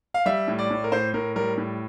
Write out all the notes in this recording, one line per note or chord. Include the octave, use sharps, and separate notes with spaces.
F5
G3 E5
A2
D5
A2
A#4
A2 C5
A2 A#4
G3 A#4
A2